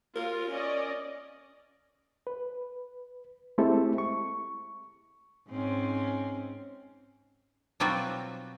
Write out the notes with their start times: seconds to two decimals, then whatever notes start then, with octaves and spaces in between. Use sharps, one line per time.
0.16 F4 A#4
0.50 C#4 D5 D#5
2.27 B4
3.58 G#3 A3 C4 E4 G4 A4
3.98 C#6
5.49 G#2 C4 C#4
7.80 B2 F#3 G3 C4 F4 F#4